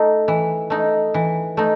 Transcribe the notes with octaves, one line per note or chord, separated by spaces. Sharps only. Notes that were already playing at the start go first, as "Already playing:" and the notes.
Already playing: A3 D#4
E3
A3 D#4
E3
A3 D#4